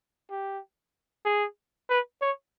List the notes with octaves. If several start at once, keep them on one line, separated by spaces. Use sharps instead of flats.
G4
G#4
B4
C#5